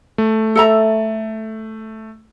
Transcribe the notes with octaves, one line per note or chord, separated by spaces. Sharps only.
A3
A4 E5 A#5